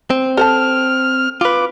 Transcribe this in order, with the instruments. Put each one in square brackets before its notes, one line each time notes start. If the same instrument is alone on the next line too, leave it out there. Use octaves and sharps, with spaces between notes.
[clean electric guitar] C4
[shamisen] A4 C5 A5 [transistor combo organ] F6
[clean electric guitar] F4 B4 [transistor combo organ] D6